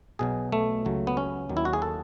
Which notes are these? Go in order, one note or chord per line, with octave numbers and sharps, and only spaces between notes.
B1 B2 F#3 G#4
A3
C#2 C#3 F#3
B3
C#4
D#2 D#3 F#3
E4
F#4
G#4
A4